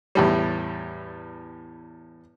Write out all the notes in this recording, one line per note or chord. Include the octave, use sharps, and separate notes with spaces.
E2 A2 G3